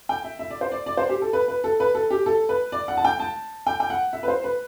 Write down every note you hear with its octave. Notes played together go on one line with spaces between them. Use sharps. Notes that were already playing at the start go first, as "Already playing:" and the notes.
G5
E5
E5
D5
C5
D5
D5
C5
G4
A4
B4
B4
A4
B4
A4
G4
A4
B4
D5
F#5
A5
G5
A5
G5
G5
F#5
E5
B4
C5
B4